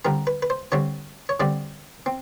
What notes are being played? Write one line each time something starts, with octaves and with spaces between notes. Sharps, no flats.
D3 G3 C4 A#4
B4
B4
C5
D3 G3 C4 C#5
C#5
D3 G3 C4 D5
C4